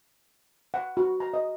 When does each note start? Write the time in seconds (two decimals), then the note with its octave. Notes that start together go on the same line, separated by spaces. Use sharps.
0.74 F#5
0.97 F#4
1.20 A#5
1.34 D#5